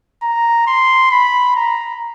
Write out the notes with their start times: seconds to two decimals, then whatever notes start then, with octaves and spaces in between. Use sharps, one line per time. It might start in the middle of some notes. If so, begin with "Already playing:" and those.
0.23 A#5
0.67 C6
1.11 B5
1.56 A#5